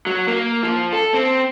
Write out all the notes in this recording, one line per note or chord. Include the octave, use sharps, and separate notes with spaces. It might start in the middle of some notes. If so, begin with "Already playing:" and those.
F#3
A#3
F3
A4
C4